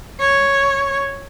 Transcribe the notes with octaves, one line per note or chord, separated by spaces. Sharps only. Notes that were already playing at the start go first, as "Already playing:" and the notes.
C#5